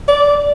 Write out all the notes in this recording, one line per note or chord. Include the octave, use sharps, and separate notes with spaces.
D5